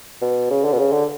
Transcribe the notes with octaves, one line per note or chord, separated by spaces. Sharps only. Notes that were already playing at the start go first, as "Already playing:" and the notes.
B2
C#3
D3
B2
C#3
D3